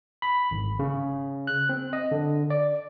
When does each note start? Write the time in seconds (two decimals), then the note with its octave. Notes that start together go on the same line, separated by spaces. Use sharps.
0.22 B5
0.51 G#1
0.79 C#3
1.47 F#6
1.69 C4
1.93 D#5
2.11 D3
2.50 D5